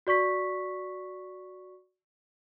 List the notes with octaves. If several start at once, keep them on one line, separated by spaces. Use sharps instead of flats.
F#4 D5 C#6 B6